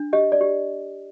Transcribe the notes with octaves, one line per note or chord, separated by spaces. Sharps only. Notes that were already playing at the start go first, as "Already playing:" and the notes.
Already playing: D4
G4 D#5
D5
G4